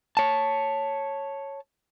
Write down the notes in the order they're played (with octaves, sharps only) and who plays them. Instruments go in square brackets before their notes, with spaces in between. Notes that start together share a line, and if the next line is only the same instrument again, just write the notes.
[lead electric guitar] C#5 A5